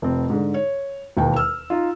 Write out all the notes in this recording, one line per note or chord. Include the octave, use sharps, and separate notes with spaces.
F1 C4
G#2 D3
C#5
E1 D#2 D#3 D#4 G5
E6 F6
D#4 F4